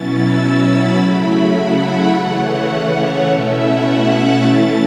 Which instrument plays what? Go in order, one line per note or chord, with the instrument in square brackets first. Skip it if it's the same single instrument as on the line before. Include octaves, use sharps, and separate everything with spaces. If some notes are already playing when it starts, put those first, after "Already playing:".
Already playing: [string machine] B2 F#3 C#4 E4 A6
E6
B5
C#3 F#3 A3 E4
F#5
E5
C#3 E3 A3 C#4 F#5
F#5
C#5
B2 A3 C#4 E4 E5
F#5
F#6
A6
E3 A3 C#4 E4